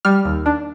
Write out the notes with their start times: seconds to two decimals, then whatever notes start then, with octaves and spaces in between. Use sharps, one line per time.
0.05 G3 F6
0.25 D#2
0.46 D4